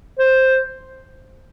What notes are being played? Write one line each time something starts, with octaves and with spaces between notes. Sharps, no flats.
C5